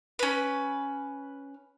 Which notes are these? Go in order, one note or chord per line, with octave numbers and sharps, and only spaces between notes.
C#4 B4